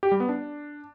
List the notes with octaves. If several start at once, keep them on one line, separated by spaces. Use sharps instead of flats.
G4
G3
B3
D4